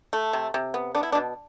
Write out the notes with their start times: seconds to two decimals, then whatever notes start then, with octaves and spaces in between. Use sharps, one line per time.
0.13 A3
0.33 C3
0.54 C3
0.74 B3
0.95 B3 D4
1.03 E4
1.12 D4
1.15 B2